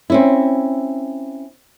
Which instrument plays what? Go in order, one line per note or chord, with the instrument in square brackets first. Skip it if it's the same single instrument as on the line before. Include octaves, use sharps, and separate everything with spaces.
[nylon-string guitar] C4 C#4 E4